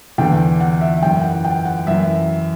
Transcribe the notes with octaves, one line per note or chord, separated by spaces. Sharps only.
E2 D3 G5
F#5
E5
F#2 E3 G5
F#5
G5
F#5
F#2 E3 E5